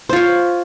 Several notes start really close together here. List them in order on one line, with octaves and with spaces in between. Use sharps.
C5 F4 C#5